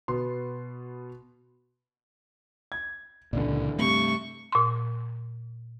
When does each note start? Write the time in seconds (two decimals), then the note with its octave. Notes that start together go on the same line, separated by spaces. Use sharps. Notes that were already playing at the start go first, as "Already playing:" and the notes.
0.08 B2 B3 C6
2.72 G#6
3.33 C#2 A#2 D3 E3 D5
3.79 G2 C3 A3 C#6
4.52 A#2 C6